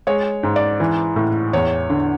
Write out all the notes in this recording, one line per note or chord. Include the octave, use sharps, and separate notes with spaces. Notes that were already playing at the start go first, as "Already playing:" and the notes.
G#3 C#5
G#2
D5
E3
A2
E2 C#5
D3